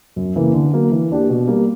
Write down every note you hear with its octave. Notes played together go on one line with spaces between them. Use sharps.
F#2
C#3 E3 A#3
D3
F#3 A#3
E3
A#3 D4 G4
B2
G3 A#3